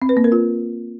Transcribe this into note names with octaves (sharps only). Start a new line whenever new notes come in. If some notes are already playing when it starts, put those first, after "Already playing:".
C4
B4
A#3
A#4
F4